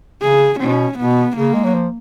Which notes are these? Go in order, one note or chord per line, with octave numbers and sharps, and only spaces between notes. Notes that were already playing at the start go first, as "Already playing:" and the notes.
C#3 G#4
B2 C#4
B2 B3
C#3 A#3
G#3
F#3
F3